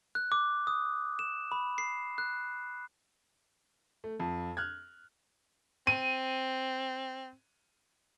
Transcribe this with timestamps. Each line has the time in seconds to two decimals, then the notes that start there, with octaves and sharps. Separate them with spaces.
0.15 F#6
0.32 D6
0.67 D#6
1.19 E7
1.52 B5
1.78 C7
2.18 F#6
4.04 A3
4.20 F2
4.57 F6 F#6 G#6
5.87 C4 D#7